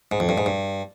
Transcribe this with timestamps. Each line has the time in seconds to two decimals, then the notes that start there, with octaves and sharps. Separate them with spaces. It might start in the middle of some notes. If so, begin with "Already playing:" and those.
0.12 G#2
0.20 F2
0.29 G2
0.38 G#2
0.46 G2